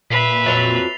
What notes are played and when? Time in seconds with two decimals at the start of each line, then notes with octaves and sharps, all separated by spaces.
0.10 A#2 B4 E5 B6 C7 F7
0.46 F2 F#3 A6 F7 G7